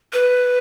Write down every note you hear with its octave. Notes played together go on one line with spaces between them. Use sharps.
B4